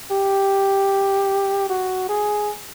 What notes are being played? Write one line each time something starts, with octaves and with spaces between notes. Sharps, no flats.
G4
F#4
G#4